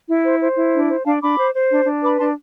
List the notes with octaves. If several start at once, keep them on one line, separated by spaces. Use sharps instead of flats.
E4
C5
C5
E4
D4
C5
D4 F5 A5
D4 B5 D6
C5
C5
D4
D4
B4 B5 D6
D4 A5 C6